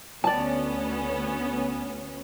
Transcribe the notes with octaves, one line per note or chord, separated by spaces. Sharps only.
D2 B3 C#4 D5 A5